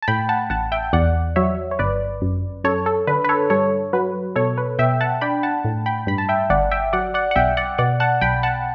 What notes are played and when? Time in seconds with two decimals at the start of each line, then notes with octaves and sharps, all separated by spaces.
0.02 A5
0.08 A2 G5 B5
0.29 F#5 A5
0.50 A1 F#5 A5
0.72 E5 G5
0.93 E2 D5 F#5
1.36 F#3 C#5 E5
1.71 C#5
1.79 G1 B4 D5
2.22 F#2
2.64 F#2 A4 C#5
2.86 A4
3.07 D3 B4
3.25 B4
3.29 A4 C#5
3.50 G2 A4 C#5
3.93 F#3 B4
4.36 B2 A4 C#5
4.58 B4
4.79 B2 E5 G5
5.01 F#5 A5
5.21 D4 G5 B5
5.43 F#5 A5
5.64 A2
5.86 G5 B5
6.07 G2 B5
6.18 A5
6.29 E5 G5
6.50 G1 D5 F#5
6.71 E5 G5
6.93 F#3 D5 F#5
7.14 D5 F#5
7.31 F#5
7.36 B1 E5 G5
7.57 D5 F#5
7.78 B2 D5 F#5
8.00 F#5 A5
8.21 B1 G5 B5
8.43 F#5 A5